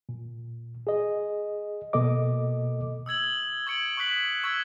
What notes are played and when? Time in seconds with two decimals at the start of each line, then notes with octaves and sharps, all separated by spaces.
0.09 A#2
0.87 G#4 D#5
1.93 B2 A#3 A4 D#5 D6
3.06 D#6 E6 G#6 F#7
3.67 C#6 G#6 C#7 D7 F#7
3.97 C#6 D#6 F#6 B6 F#7
4.44 C#6 E6 G#6 B6